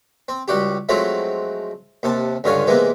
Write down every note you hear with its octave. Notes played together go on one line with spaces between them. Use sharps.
C4
C#2 G3 F#4 G4
F3 F#3 G#3 A3 C4 E4
D#2 C3 A5
C#2 G2 D3 F4 C#5 G#5
C3 E3 G#3 A#3 B3